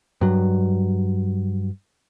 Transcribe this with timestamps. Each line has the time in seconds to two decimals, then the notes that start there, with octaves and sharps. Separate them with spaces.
0.21 G2 F#3